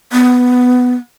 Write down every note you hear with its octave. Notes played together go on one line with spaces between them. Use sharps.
B3